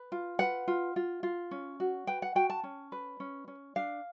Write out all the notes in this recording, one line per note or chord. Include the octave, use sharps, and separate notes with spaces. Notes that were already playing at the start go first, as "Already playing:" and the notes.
Already playing: B4
F4
B4 F#5
F4
F4
F4
C#4
F#4
B4 G5
F#5
F#4 G5
A5
C#4
B4
C#4
C#4
D4 F5